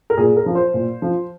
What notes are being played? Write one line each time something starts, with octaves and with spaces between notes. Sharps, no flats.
A#4
A#2 G#4
A#4
F3
C5
A#2
F3